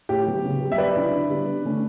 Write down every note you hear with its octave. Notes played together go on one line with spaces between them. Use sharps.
A2 G4
F#3 B3
C#3
G3 B3
E5
F#3 B4 D5
C#4 E4
D3
G3 B3
D3
A3 C#4